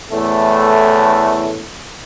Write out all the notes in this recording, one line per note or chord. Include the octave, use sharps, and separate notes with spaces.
E2 A2 A3